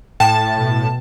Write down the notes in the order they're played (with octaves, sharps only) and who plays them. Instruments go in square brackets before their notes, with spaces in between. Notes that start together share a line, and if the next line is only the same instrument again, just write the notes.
[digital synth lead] A2 [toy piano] G5 [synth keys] A5
[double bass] B2